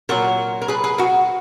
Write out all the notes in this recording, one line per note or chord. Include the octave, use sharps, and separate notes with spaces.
A#2 F#3 F#4 A#4
A#4
G#4 B4
G#4 B4
F#4 A#4